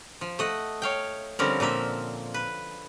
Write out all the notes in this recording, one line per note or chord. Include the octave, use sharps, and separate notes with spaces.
F3
A3 D#5 F#5
C#5 F5 G5
D3 F3 G3 C4 C#4 A#4
A#2 F3 A#3 E5
B4